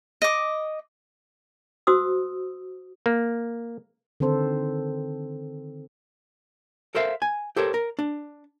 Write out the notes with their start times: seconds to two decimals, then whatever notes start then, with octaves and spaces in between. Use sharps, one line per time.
0.22 D#5 D6
1.87 F#4 C5 D#6 E6
3.06 A#3
4.20 D3 D#3 C4 A4 C5
6.95 A4 A#4 C5 E5 F5
7.22 G#5
7.56 G4 A4 A#4 C5 C#5
7.74 A#4
7.99 D4